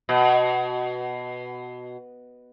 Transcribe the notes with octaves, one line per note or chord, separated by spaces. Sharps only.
B2